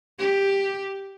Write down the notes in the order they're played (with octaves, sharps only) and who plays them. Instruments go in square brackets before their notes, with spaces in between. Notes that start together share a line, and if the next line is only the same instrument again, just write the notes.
[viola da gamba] G4